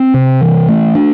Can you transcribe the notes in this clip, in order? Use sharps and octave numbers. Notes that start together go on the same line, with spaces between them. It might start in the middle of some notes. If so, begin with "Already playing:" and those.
Already playing: C4
C3
E3
A3
D4